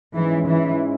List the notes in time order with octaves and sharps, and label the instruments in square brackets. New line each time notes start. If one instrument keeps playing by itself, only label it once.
[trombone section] G#2 G#3 C#4 E4 [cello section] E3
[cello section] E3